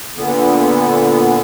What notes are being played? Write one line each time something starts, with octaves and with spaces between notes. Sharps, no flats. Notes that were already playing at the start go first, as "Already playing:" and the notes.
A#2 D3 B3